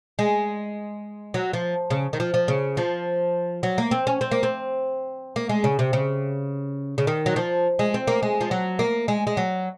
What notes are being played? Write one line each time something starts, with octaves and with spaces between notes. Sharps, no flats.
G#3
F#3
F3
C#3
D#3
F3
F3
C#3
F3
F#3
A#3
C4
C#4
C4
A#3
C4
A#3
G#3
C#3
C3
C#3
C#3
D#3
F#3
F3
G#3
C4
A#3
G#3
F3
F#3
A#3
G#3
G#3
F#3